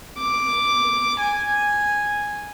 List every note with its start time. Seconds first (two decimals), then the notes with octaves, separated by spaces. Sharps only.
0.18 D6
1.20 G#5